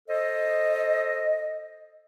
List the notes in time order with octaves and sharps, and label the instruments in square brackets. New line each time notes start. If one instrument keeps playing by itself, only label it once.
[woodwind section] A4 C5 D#5